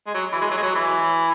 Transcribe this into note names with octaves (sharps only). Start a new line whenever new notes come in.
G#3
F#3
E3
G#3
F#3
G#3
F#3
E3